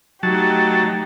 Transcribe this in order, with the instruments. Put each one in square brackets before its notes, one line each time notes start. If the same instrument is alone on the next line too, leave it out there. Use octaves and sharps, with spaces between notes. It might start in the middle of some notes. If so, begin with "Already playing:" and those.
[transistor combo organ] F#3 A5 [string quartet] A3 D#4 G4